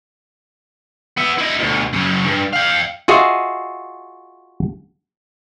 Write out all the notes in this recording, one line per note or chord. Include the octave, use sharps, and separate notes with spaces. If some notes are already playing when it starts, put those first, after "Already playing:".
B3 E5
E4 D#5
D2 B2
F#2 C#3
G2
F5 G5
F4 F#4 G#4 D#5 E5